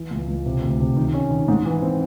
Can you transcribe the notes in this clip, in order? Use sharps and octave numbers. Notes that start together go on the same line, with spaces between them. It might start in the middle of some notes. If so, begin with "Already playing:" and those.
Already playing: E3
C#2
C#2
C3
D2
C3
D#3
C#4
D#3
G#2
E3
C4